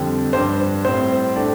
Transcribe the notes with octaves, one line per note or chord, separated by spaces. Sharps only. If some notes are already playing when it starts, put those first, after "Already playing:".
Already playing: F2 D3 G3 C4
G2 G3 D4 C5
A2 G3 C4 C5
A2 A3 D4